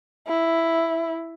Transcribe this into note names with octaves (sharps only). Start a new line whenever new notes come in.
E4